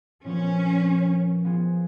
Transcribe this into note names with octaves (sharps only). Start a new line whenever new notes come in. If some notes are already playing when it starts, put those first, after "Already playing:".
A#2 F3 B3 C#4 F#4
F3 B3 F4 G#4